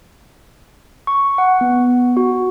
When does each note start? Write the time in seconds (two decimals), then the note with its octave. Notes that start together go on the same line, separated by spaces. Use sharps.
1.07 C#6
1.38 F#5
1.61 B3
2.17 F#4